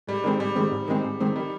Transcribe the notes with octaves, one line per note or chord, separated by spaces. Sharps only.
G#2 G3
D#3 G3 G#3 C4
G#2 G3
D#3 G3 G#3 C4
G#2
D#3 G#3 C4
G#2
D#3 G#3 C4
D#3 G3